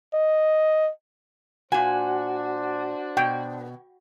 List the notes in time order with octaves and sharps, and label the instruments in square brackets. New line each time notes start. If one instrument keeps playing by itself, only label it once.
[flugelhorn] D#5
[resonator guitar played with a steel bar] A#2 G#5 [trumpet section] D4 C5 [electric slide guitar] F#4
[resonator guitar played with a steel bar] B2 [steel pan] G5